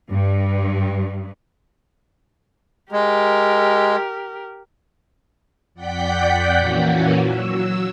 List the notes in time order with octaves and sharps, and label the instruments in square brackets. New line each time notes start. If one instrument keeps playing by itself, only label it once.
[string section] G2
[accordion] G#3 [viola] G4 A#4
[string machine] F2 D5 F#5 G5 G6 B6
A#2 E3 A#3 C#4 F#4
F#3 E6